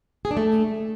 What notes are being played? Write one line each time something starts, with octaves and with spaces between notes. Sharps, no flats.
G#4
D4
A3